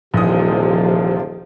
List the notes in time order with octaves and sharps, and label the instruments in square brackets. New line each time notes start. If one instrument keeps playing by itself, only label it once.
[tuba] D#1 [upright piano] A#1 E3 D#6 [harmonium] C3 [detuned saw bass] F3